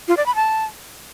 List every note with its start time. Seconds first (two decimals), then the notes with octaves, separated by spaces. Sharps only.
0.08 F4
0.17 D5
0.26 B5
0.35 A5